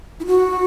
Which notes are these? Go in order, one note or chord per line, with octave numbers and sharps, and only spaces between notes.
E4
F#4